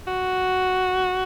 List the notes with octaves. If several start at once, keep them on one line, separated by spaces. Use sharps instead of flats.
F#4